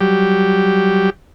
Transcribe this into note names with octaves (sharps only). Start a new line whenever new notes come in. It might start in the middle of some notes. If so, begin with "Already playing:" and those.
F#3 G3 G4